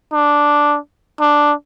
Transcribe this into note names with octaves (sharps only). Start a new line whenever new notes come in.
D4
D4